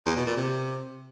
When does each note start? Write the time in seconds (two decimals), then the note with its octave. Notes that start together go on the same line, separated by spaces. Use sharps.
0.06 E2
0.16 B2
0.26 A#2
0.37 C3